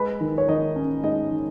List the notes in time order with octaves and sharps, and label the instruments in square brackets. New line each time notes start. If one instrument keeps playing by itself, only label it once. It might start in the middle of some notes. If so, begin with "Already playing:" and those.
Already playing: [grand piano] G#3 B4 B5
D#3
C#5
D#3 D#4 D#5
C#4
G#3 D#4 D#5
D#3